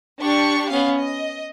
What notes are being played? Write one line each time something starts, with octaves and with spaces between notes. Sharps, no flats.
D4 G4 C#6
B3 C#4 F5
D#5